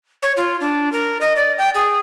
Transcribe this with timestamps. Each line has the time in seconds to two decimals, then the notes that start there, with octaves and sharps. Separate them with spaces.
0.23 C#5
0.37 F4
0.61 D4
0.92 A#4
1.21 D#5
1.36 D5
1.58 G5
1.75 G#4